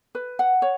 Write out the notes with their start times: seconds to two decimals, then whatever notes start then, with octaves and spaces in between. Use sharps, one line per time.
0.15 B4
0.39 F#5
0.62 C#5